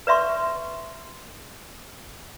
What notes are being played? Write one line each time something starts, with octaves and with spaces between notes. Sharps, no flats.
B4 D5 E5 C6 C#6